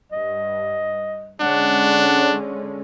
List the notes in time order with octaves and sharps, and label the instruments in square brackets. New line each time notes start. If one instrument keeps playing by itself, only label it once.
[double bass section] G2 [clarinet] D#5
[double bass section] D3 G#3 C#4 [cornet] D4 [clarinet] F#5